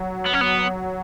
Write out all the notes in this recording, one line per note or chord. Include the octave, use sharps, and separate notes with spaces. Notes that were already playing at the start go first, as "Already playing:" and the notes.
Already playing: F#3
B3
C#4
B3